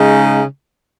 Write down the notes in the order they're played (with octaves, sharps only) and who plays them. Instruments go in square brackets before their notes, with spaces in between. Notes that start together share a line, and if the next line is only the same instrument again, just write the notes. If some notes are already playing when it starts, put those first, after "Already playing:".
Already playing: [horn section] C#3 G#3 D#4